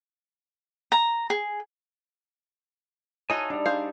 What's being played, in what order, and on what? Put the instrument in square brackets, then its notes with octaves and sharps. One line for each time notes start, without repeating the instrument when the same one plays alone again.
[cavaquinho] A#5
G#4
[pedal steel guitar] D#4 G#5 [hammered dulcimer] E4 A4 [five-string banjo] F#4 C#5 D#5
[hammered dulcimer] G3 [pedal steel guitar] D4 D#4
[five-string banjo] G#4 C5 F5